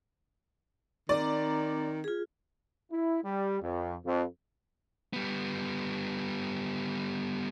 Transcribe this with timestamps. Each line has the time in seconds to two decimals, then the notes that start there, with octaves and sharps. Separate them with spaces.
1.09 D#3 C4 D5 A#5
2.04 F4 G#4
2.91 E4
3.24 G3
3.62 F2
4.05 F2
5.13 G3 B3